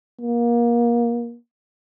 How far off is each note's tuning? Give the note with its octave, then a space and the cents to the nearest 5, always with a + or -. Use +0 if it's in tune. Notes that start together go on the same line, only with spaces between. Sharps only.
A#3 +25